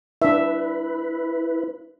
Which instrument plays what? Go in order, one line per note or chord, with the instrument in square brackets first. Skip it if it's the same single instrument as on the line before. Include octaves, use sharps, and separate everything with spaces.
[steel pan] D4 E5 [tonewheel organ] E4 B4